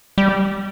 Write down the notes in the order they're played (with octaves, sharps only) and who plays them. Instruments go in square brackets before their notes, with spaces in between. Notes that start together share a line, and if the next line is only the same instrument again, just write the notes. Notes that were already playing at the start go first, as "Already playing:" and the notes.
[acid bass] G3